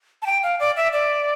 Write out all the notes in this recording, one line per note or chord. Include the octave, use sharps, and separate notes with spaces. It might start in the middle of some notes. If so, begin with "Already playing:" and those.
A5
G5
F5
D5
E5
D5